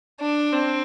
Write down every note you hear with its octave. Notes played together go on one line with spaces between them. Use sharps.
D4
C4